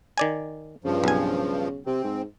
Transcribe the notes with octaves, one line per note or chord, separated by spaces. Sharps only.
D#3 D5 G#5
G2 C#3 F3
B1 C#3 G#5
C3 C4
G#2